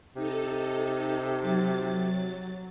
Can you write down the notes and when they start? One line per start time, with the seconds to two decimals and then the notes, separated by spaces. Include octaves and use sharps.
0.16 C3 D#4 A4
1.42 F#3 A6